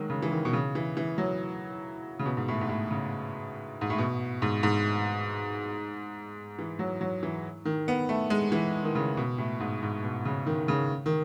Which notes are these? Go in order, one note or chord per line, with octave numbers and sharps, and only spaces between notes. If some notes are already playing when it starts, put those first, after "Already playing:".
Already playing: D#3 F#3 G#3
C#3
E3
D#3
B2
C#3
E3
E3
F#3
C#3
B2
G#2
A2
G#2
A2
C#3
G#2
A2
B2
G#2
G#2
E3
F#3
F#3
E3
D#3
B3
A3
G#3
E3
D#3
C#3
B2
A2
G#2
G#2
B2
C#3
D#3
C#3
D#3